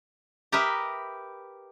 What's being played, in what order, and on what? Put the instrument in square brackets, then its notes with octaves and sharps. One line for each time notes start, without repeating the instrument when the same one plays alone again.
[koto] G4 A#4 B4 D#5 E5